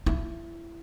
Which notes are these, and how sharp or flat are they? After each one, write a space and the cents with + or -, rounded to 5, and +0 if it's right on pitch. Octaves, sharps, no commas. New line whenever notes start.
E4 +25